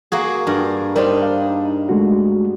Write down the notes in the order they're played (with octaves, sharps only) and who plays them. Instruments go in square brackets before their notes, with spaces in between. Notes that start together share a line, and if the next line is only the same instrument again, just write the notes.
[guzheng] A#3 F#4 G#4
G2 A#4
[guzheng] G3 D4 D#4 [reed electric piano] A#4 C5
[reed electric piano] F5
G#3 A3 F#4